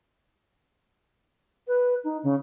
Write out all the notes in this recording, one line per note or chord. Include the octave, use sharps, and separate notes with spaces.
B4
D#4
C#3